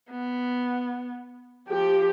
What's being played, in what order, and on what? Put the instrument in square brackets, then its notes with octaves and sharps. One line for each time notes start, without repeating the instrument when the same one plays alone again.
[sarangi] B3
[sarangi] F3 [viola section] G4